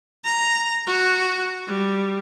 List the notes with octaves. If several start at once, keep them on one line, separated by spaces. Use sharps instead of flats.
A#5
F#4
G3